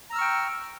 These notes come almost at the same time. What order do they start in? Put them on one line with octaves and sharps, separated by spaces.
A#5 E6 F6 C#6 G5